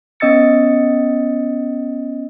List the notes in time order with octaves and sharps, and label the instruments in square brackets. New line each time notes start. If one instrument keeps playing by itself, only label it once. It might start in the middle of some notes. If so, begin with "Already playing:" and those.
[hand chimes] B3 C#4 D#5 E6 A6 C#7